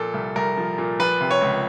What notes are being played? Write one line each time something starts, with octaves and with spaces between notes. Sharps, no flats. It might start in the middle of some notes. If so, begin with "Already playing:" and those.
Already playing: A#2 F3 A4
C2
C2 A#4
F3
A#2
F3 B4
C3
C#5
C#2